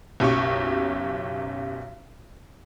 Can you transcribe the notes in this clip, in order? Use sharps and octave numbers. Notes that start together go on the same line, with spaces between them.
F#1 B1 F#2 G4 C#6